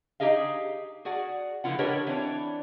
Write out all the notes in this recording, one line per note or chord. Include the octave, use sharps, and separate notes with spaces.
D#4 G4 G#4 D#5 F5
F#4 G#4 D5 F#5
D3 F3 B3 E4 F4 F#5
D4 G4 A#4 B4 C#5 D#5
E3 C4 D4 C#5